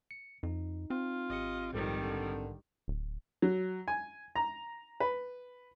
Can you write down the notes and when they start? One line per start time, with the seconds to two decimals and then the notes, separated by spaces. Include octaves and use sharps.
0.11 C#7
0.43 F2 D#4
0.90 C4 F4
1.30 G#1 G4 D#5 C#7
1.73 A#1 F2 G#2 D#3 G3 A#4
2.03 D3
2.88 D1
3.42 F#3
3.88 G#5
4.36 A#5
5.00 B4